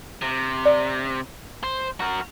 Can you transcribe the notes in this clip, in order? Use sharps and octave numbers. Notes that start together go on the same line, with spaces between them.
C3
D5
C5
F#4 A#4